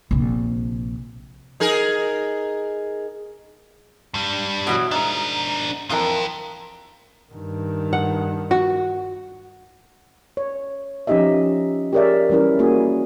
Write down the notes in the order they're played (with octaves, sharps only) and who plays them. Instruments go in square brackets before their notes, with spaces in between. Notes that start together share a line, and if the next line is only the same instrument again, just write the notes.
[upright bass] A#1 C3
[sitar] D#4 G#4 A#4
[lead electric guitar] G2 G3
[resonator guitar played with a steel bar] B2 E3 F#3
[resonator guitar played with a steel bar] G#2 [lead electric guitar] D4 A#4
[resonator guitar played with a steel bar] F2 E3 A#4 [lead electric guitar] F4 G5
[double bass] G2 D#3
[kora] F#5
F#4
[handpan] C#5
F3 C#4 D#4 G4 D#5 E5
G4 G#4 A#4 C#5 D5 E5
E3 G3 C#4 E4 A#4
A#3 E4 F#4 G#4